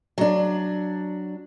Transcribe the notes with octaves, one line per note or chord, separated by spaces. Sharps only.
F#3 D4